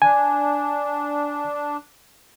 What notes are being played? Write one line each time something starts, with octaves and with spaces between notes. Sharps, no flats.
D4 G#5